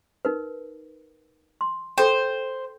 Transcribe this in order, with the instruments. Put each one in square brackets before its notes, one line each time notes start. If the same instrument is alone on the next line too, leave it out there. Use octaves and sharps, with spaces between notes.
[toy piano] D#4 A#4 B4
C6
[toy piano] A4 G5 [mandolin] C5